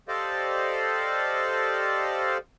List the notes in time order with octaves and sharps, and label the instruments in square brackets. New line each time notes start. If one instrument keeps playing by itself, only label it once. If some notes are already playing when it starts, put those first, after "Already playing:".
[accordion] G4 A4 C5 D5 D#5 F5